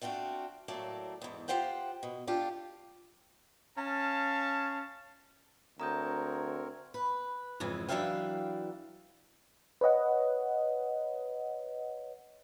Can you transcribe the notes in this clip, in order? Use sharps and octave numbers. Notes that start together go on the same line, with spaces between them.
A3 C4 D4 F4 F#4
A2 F#3 A3 A#3 D5 A5
E2 G#2
F4 G4 C5 F#5 G5
B2
D4 F4 G4 A4
C#4 F5 A5
D2 C4 A#4 C#5 A#5 D#6 G6
B4
F2 G#2 C#3 E3
E3 F#3 D4 E5 F5 G5
B4 C#5 D#5 F#5